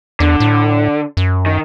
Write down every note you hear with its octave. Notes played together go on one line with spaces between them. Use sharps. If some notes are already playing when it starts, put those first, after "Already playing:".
E2 D3
A2
F#2
D#3